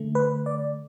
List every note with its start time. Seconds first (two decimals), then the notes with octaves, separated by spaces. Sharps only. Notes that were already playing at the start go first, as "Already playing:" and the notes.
Already playing: D3 A3
0.15 B4
0.46 D5